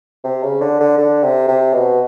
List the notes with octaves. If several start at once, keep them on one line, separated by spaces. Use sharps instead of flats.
C3
C#3
D3
D3
D3
C3
C3
B2